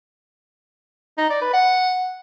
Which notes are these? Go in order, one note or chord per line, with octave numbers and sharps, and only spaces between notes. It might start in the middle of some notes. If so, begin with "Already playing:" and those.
D#4
D5
B4
F#5